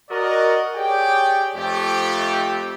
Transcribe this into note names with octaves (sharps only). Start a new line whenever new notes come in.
F#4 A#4 D5 D#5
G4 G#4 C#5 D5 G5
F2 A3 G4